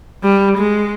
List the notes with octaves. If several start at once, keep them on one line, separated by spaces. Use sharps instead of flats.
G3
G#3